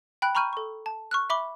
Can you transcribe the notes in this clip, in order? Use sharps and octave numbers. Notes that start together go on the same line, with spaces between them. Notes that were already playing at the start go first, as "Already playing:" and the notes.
G5 B5 F#6
A#5 B5 C#6 F6 G6 D#7
A4 C#6
A5
C#6 F6 F#6
E5 B5 D6 G7